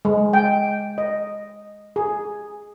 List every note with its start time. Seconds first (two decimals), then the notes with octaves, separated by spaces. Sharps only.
0.05 G#3
0.33 G5
0.98 D#5
1.96 G#4